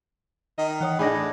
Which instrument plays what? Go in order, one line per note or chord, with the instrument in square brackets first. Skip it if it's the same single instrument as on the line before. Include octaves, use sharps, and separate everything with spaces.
[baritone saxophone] D#3 [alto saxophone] D#5
[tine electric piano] E3 C#5 D#6 [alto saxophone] F#5
[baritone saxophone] A2 [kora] D4 G#4 [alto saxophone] D#4 [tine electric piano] B5 A#6